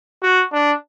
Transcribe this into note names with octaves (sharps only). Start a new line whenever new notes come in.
F#4
D4